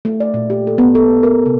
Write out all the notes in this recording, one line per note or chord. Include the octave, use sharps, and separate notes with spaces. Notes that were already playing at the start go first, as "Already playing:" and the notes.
A3
D5
A#2
G4
A4
B3
A4
A#4
C3